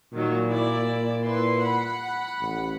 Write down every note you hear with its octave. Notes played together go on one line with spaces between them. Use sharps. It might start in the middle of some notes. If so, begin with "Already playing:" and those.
A#2 D#3 F#3
E4 D5
E4 B4 C6
F#5 B5
A1